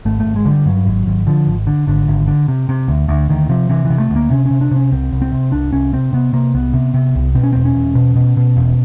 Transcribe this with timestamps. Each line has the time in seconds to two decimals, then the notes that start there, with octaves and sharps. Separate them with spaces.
0.05 G#1 A3
0.20 A3
0.25 G#1
0.36 G#3
0.45 D3
0.51 G3
0.66 G2 F#3
0.86 G#1
1.06 G#1
1.27 D3 F3
1.47 G#1
1.67 D3
1.87 G#1 D3
2.08 G#1
2.27 D3
2.48 C3
2.69 C3
2.88 D2
3.08 D2
3.29 D2 D#3
3.49 C3 F3
3.69 C3 E3
3.85 E3
3.90 C3
4.00 A3
4.10 D2
4.16 A#3
4.30 C3 C#4
4.46 C#4
4.51 C3
4.61 D4
4.71 C3 C#4
4.92 C2 C4
5.12 C2
5.22 C4
5.32 C3
5.52 C2 D4
5.73 C2 C#4
5.93 C3 C4
6.13 C3 B3
6.33 C3 A#3
6.54 C2 B3
6.74 C3
6.94 C3
7.15 C2
7.35 B2 C4
7.43 C#4
7.53 E1 C4
7.65 C#4
7.75 E1
7.95 B2
8.16 B2
8.37 B2
8.57 E1